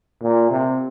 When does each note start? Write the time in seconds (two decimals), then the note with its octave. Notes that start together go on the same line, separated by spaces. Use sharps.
0.22 A#2
0.50 C3